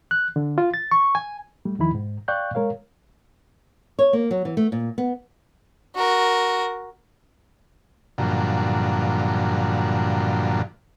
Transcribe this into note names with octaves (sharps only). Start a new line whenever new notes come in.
F#6
D3
F4
A6
C#6
G#5
G3 A3
E2 D#3 F3 D#4 E4 B5
G#2
D5 F5 G5 C#6 F#6 G6
G#3 A#4 C#5 F5
C#5
A#3
F#3
E3
A3
A#2
B3
F#4 A#4
G2 A#2 D3 F3 F#3